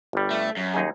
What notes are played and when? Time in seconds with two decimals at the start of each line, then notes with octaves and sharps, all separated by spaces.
0.13 G1 G3
0.31 A3
0.57 F#2
0.74 D#2 D#4 G#4